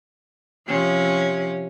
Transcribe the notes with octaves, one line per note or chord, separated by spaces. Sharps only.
C3 F3 C#4